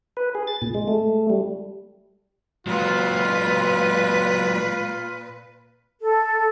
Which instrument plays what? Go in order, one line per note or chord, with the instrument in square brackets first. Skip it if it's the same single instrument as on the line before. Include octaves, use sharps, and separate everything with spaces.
[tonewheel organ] B4
G#4
A6
A#2
G#3
A3
G3
[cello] A#2 B4 [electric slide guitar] F#3 G#3 F#4 [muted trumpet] F4
[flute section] A4